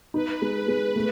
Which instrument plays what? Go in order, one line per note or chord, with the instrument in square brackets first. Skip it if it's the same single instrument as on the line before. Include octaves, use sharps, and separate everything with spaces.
[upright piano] D#4 [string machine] B4
[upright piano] G#3
G#3
A3